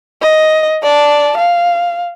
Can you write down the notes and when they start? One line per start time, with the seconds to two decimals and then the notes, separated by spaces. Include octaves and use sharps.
0.22 D#5
0.83 D5 A5
1.38 F5